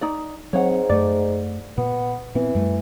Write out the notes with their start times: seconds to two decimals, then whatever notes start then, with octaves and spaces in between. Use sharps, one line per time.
0.01 D#4 D5
0.53 G#2 F#3 C4 C#5 F#5
0.90 F#2 A3 D5
1.78 A#2 B3
2.35 A#2 E3 B3 C4
2.55 F#2 G3 A3